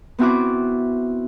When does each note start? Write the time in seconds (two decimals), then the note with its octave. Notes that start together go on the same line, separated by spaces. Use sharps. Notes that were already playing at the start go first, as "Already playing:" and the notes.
0.19 B3 C4 E4 F#4 F#5 D6